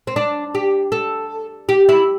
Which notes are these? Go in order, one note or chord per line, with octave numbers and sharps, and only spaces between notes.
C4
D4
G4
A4
G4
E4